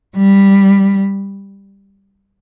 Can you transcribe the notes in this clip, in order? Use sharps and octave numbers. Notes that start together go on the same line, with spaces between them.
G3